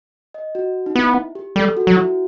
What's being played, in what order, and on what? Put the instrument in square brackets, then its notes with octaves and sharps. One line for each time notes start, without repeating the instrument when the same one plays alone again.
[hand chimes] D#5
F#4
D#4
[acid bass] B3 [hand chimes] E4
[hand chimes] G4
[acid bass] G3 [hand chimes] A4
[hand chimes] F#4
[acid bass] F#3 [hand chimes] F#4
[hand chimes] E4